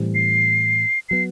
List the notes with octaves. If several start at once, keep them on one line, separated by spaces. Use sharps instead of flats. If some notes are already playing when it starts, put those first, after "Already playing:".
Already playing: A2 E3 G3 C4
C7
F#3 B3 C7